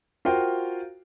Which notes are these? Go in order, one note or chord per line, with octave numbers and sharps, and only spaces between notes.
F4 F#4 A#4 C5 F5 G5